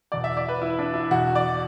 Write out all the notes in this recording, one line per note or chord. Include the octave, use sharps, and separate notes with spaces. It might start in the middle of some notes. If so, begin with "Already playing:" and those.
E2 B2 D5
E5
D5
B4
E4
D4
E4
E2 B2 F#4
D5